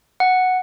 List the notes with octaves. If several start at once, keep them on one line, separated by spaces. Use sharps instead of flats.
F#5